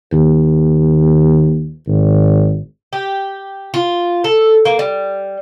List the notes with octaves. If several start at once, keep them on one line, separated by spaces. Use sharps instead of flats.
D#2
G#1
G4
F4
A4
A#3
G3